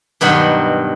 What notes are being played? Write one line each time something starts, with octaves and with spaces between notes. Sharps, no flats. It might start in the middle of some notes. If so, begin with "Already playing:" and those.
G2 B2 D#3 F#3